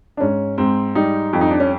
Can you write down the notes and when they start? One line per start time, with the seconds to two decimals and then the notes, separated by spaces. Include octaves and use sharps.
0.17 D4
0.20 G#2 C#4
0.58 G#2 C4
0.95 G3 D#4
1.33 F2
1.41 D#4
1.51 D4
1.60 C#4